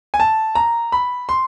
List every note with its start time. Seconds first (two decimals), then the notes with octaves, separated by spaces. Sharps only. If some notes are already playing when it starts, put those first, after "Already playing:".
0.14 G#5
0.20 A5
0.55 A#5
0.92 B5
1.29 C6